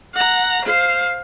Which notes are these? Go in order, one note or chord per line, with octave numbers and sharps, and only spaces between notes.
F#5 A#5
C5 F5